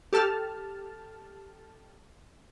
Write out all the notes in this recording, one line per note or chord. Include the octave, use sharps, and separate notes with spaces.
G4 A4 A5 F6